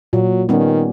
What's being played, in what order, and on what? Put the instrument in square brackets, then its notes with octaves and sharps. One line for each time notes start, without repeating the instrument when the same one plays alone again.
[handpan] A#2 [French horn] F#3
[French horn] D#3 [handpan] G3 B3 C#4